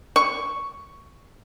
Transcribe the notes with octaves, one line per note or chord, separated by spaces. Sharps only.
C#6